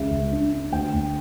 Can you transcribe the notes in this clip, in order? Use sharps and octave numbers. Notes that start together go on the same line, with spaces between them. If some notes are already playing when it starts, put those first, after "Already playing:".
Already playing: C#2 C#3 E5
C#2
D4
D4
D2 G5
D2